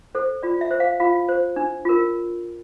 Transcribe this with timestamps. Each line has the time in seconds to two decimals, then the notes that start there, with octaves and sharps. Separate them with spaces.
0.15 A4 C5
0.43 F4 D5
0.61 E5
0.71 C5
0.80 F5
1.00 F4 F5
1.29 C5
1.56 D4
1.85 F4 A#4